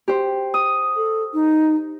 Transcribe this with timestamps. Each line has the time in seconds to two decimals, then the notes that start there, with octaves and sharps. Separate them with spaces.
0.08 G4 C5
0.54 D#6
0.96 A4
1.34 D#4